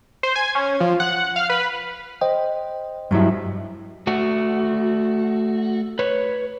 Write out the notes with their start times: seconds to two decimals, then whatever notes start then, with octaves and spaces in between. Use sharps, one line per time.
0.23 C5
0.36 G#5
0.55 C#4
0.80 F3
1.00 F#5
1.36 F5
1.50 B4
2.21 C5 D#5 G5
3.11 G2 F#3 E4
4.07 A3 F#4
5.99 B4 C#5